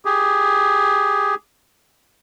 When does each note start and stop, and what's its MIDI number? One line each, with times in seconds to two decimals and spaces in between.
0.05 1.35 67
0.05 1.35 68